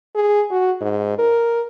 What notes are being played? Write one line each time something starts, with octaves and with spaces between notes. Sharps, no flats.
G#4
F#4
G#2
A#4